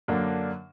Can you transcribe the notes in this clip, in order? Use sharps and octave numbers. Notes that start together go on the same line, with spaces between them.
F#2 D3 A#3 D4